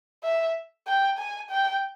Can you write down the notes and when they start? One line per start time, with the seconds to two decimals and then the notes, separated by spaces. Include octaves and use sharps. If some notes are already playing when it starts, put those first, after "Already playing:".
0.24 E5
0.87 G5
1.19 G#5
1.50 G5